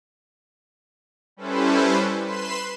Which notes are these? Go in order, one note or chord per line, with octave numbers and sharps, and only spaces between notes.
G3 C#4 E4 A4 B4 C5
B4 B5 C6 C7 E7